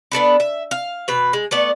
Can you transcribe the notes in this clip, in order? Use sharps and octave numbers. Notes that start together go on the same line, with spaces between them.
B3 D4 A4 B4
E5
F5
B2 B4
G#3
A3 B3 D5